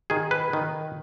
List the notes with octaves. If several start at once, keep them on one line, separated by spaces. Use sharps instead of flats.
D#3 G#4
B4
D#3